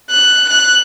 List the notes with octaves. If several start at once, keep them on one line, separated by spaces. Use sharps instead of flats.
F#6
F#6